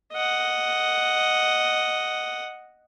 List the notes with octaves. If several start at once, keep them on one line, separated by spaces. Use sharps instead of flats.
D#5 F#5